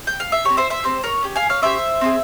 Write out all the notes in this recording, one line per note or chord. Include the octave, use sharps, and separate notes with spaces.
G5
F5
E5
C4 G4 A#4 C#5
C5 E5
C5 E5
C4 G4 C5
A#4 C#5
C#4 G4
F5 G#5
C#5 F5
C#4 G4 C5 E5
C4 F4 G#4